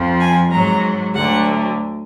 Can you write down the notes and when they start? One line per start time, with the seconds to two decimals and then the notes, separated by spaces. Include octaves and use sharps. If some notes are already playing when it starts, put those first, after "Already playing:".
Already playing: F2 F3
0.19 G#5
0.51 G#2 F#3 A#5
1.14 D2 D3 F#3 F#5